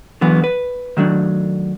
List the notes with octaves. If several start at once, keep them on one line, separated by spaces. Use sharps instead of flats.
D3 E3 F#3 B3
B4
D#3 F#3 A3 D4